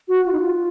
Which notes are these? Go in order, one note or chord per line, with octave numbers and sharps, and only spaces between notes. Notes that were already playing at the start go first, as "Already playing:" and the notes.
F#4
F4
D#4
F4